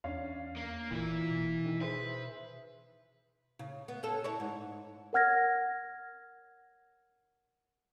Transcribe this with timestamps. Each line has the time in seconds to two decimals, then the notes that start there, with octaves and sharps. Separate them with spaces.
0.04 E2 C#4 D4 F5
0.57 A#3
0.91 G1 A#2 E3 E4
1.30 B2
1.66 D#3
1.81 G#4 B4 C5 E5
3.59 C#3
3.88 B3
4.03 C#4 A4
4.24 E4 C#5
4.40 G#2
5.13 A#4 C#5 F#5 F6 G#6 A#6